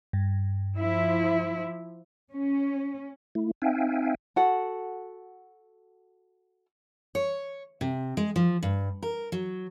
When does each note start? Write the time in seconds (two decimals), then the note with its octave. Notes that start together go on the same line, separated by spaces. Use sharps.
0.13 G2
0.77 F3 E4
2.33 C#4
3.35 A3 E4
3.62 C4 D#4 E5 F5 G5 G#5
4.36 F#4 A4 F#5
7.15 C#5
7.81 C3
8.17 G#3
8.36 F3
8.63 G2
9.03 A#4
9.32 F#3